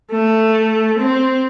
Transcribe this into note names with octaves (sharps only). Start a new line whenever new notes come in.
A3
C4